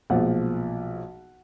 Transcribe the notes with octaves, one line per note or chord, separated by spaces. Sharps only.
B1 A#2 F3 G#3 F#5